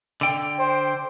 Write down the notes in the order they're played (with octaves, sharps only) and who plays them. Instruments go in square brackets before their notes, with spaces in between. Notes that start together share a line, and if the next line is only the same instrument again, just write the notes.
[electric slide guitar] D3 G5
[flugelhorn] C5